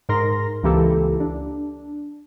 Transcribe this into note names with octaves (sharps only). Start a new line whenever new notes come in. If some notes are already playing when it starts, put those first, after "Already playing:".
G#2 A#4 C6 A#6
C#2 E3 A#3 G4 A4
D4